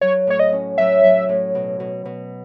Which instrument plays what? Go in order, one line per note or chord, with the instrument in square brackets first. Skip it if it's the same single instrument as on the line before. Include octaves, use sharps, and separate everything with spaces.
[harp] F#3 [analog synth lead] C#5
[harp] A2 [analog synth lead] C#5
[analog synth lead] D#5
[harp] C#4
[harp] F#3 [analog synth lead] E5
[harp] F#3
A2
B2
B2
B2